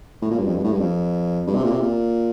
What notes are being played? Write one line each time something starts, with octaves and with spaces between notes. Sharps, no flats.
A2
A#2
G2
F2
G2
A2
G2
F2
G2
C3
A#2
C3
A#2